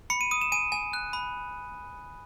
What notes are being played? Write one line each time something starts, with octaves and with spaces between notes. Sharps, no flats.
B5 C#7
D#7
D#6 D#7
E7
G#5 D#7
G#5
F#6
B5